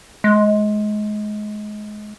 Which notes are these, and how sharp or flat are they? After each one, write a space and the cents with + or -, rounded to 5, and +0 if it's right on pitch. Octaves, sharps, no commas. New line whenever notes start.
G#3 +25